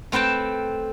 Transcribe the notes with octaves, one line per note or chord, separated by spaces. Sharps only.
A3 C4 B4 G5 A5